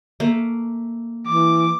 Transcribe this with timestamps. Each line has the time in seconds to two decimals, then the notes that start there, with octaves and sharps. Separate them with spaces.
0.20 A3 A#3
1.27 E3 D6